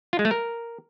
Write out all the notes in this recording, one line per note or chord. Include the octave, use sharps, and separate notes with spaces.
F4
G#3
A3
A#4